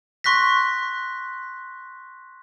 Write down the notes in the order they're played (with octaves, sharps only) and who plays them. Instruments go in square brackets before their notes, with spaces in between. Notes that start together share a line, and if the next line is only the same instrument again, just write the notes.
[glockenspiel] C6 C#6 F#6 A#6 B6